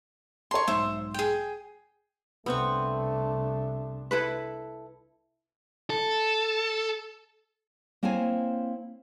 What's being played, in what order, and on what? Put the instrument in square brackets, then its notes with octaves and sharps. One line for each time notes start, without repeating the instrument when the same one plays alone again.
[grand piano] C#5 A5 A#5 [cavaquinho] C6 C#6
[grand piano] B1 G#2 C6 [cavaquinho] C5 E5
[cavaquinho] G#4 G5
[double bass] C2 D4 [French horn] A3 [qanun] B3 C4 C#6
[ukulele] E4 A4 B4
[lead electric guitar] A4
[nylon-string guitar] A#3 C4 E4 C5 C#5 G#5